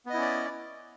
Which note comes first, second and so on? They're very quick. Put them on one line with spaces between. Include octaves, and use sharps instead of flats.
B3 D#5 E4 C#4 D5